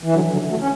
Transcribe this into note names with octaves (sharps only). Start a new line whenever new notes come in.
E3
D3 F#3
D3 F#3
F#3 A3
C#4